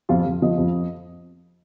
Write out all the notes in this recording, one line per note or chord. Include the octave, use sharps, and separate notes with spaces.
F2 F4 F5
F2
F3 D#5
F2